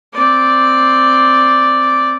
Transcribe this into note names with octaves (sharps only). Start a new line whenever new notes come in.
C4 D5